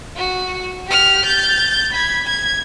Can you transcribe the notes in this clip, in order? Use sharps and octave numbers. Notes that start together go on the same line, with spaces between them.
F#4
G4 F6
G6 A6
B5 G#6
G#6